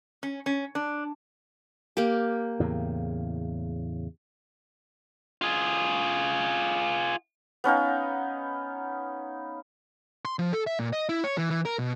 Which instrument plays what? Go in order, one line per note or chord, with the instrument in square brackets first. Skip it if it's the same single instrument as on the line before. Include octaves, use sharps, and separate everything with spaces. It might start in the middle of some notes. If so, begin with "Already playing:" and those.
[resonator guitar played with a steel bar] C#4
C#4
D4
[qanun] A#3 G4
[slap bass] E2 A2 C#3
[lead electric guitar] F4 G#4
[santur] B3 C#4 D#4 F5
[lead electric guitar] C6
F3
A4
E5
A#2
D#5
E4
C#5
E3
E3
A#4
B2